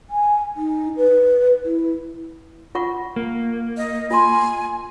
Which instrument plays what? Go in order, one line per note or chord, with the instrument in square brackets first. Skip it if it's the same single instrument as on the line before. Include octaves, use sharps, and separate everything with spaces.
[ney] G#5
D#4
B4
E4
[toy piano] F4 F#5 C#6
[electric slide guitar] A#3
[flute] D#5
[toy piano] F4 C6 [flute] G#5